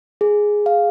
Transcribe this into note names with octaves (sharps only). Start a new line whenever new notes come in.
G#4
F5